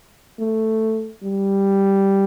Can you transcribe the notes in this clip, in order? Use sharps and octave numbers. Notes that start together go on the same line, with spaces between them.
A3
G3